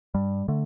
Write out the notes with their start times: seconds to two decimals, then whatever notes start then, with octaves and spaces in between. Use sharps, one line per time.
0.14 G2 G3
0.48 D3 A3